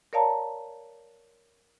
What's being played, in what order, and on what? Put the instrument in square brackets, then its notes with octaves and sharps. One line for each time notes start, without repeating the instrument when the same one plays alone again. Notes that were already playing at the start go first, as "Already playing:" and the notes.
[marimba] A#4 C#5 D5 F5 A5 A#5